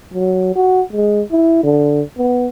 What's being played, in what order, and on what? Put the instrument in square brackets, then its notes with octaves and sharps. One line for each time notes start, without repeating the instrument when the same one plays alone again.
[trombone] F#3
F#4
G#3
E4
D3
B3